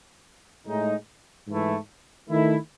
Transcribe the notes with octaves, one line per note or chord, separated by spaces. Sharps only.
A2 G#3 D#4
G#2 E3 A3 E4
D#3 A3 E4